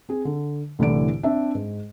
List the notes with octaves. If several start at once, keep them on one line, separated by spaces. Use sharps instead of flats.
C4 G#4
D3
C2 A2 D3 E3 D5 D7
C4 D4 E5
G#2